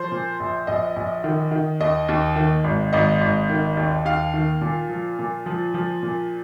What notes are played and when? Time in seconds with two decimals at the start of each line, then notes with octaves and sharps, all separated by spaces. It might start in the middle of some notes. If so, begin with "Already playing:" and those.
Already playing: F3 C5
0.12 A#2
0.40 A#1
0.67 A#1 D#5
0.96 A#1
1.24 D#3
1.51 D#3
1.80 D#2 D#5
2.08 D#2
2.36 D#3
2.64 G#1
2.93 G#1 D#5
3.21 G#1
3.49 D#3
3.77 D#2
4.05 D#2 F5
4.34 D#3
4.61 A#2
4.89 F3
5.19 A#2
5.46 F3
5.74 F3
6.03 A#2